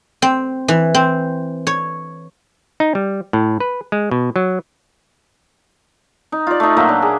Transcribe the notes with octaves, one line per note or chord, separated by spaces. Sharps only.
C4
E3
C4
C#5
D#4
G3
A2
B4
G#3
B2
F#3
D#4
F4 D5
A3 D#4
A#2 F#3 A#3 E5
D4
G#4